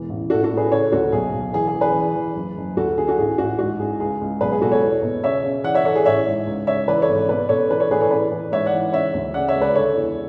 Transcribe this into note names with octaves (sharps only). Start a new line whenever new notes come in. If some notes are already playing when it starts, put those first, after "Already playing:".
Already playing: E1 E3
A1
A1 F#4 A4
F#4 A4
A2
G#4 B4
C#3 A4 C#5
D2 F#4 A4
B1 G#4
B1
E3 G#4
G#4
E3
G#4 B4
E3
E3
F#1
F#1
D2 F#4 A4
D3 G#4
F#4 A4
A1 G#4
A1 F#4
G#2 F#4
A1 G#4
C#2 G#4
C#2
B1 G#4 B4
G#4
B2 F#4 A4
A4 C#5
E2
B2
C#3 C#5 E5
C#3
E3 D5 F#5
C#5 E5
E3 A4 C#5
G#4
A1 C#5 E5
G#2
C#2
C#3 C#5 E5
E3 B4 D5
A4 C#5
G#1
B2 B4 D5
B2 A4 C#5
E3 B4 D5
A4 C#5
A2 G#4 B4
A4 C#5
E3 B4 D5
E3
G#2 C#5 E5
D5 F#5
E3
C#3 C#5 E5
D2
C#3 D5 F#5
C#5 E5
C#2
B4 D5
D3 A4 C#5
E2